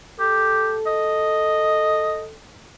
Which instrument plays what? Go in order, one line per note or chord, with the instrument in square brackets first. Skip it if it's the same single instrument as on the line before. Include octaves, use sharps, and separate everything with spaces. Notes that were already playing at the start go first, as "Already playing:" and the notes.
[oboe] G4 [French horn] A4
[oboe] D#5